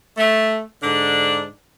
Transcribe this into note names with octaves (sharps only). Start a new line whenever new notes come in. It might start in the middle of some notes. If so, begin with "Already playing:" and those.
A3
G#2 D3 D4